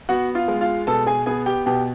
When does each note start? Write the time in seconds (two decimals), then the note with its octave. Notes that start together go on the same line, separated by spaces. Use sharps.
0.09 B3 F#4 F#5
0.35 F4 F5
0.48 G#3
0.61 F4 F5
0.87 B2 A4 A5
1.07 G#4 G#5
1.26 B3 G#4 G#5
1.46 G4 G5
1.66 B2 G4 G5